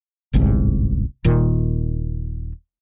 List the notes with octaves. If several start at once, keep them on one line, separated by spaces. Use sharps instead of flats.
D1 G1 C2 G#2
D#1 A#2 D#3